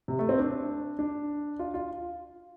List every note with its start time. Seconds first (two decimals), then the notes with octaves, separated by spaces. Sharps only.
0.08 C3
0.19 A3
0.29 C4
0.39 D4
0.99 D4
1.59 F4
1.74 F4